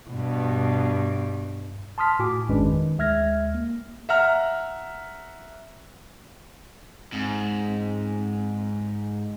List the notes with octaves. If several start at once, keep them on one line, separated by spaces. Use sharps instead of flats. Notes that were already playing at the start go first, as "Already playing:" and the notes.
G2 B2
A5 C6 D#6 F6 B6
A2 F#4 G#5 D6
G#1 F2 G#3 C#4 D4 B4
D#3
D2 G#3 E5 F6 G#6 A#6
A#3
E5 F#5 A#5 F6
G#2 C4